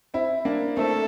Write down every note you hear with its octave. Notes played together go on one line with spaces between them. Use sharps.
C4 E4
A#3 D4
A3 C4 A4